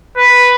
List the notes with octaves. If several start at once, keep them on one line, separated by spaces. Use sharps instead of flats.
B4